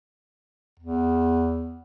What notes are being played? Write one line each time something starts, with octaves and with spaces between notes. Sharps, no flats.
E2